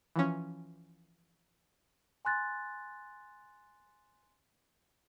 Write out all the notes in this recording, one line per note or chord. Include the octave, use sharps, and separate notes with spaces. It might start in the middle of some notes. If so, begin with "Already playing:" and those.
E3 F3 C#4
G#5 C6 F#6 A6